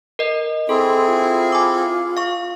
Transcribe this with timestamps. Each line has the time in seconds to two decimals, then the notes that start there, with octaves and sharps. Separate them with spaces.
0.19 A#4 D#5
0.69 C4 E4 G#4 A4 C6
1.07 F4
1.52 G#5 D6
2.17 F5 C#6